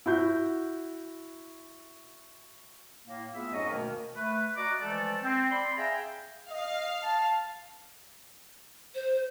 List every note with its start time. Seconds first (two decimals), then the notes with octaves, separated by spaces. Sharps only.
0.06 E4 F#4 G6
3.05 A2 A#3
3.34 A3 B3 F4 G#4 E5
3.52 F2 G#2 F#3 C#4 F#4 D#5
3.68 D2 B2 D#3 A#3
4.16 A3 B4
4.57 F#4 D5 D#5 F#5 A#5 D6
4.80 E3 F3 G#3 A3 A4 D5
5.23 C4
5.50 D5 B5 C6
5.77 G#4 E5 F5 G5 G#5 A#5
6.50 D#5 F5
7.03 A5
8.95 C5